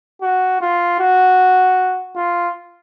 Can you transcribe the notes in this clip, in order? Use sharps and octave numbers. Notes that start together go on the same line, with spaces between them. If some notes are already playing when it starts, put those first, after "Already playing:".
F#4
F4
F#4
F4